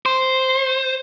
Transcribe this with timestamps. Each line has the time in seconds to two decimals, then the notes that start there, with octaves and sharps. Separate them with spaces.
0.06 C5